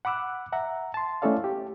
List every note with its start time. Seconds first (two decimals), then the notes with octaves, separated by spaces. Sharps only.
0.05 F#5 B5 D6 E6 F#6
0.52 E5 F#5 A#5
0.94 A5 C6
1.22 A3 C#4 E4 A4 D5 F5
1.44 G4